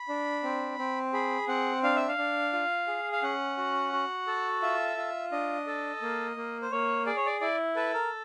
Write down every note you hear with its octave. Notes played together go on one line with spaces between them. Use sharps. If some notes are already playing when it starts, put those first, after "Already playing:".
Already playing: B5
D4
C4
C4
G#4 B5
C4 F#5
D4 F5
E5
F5
D4
F4
G#4
F5
C#4 F#5
F#4
F#4
A4
F4 E5
F4
D4 D#5
A4
A#3
A#3
C5
A#3 C#5
G#4 D5
C#5
D5
E4 D5
A4 B4
A#4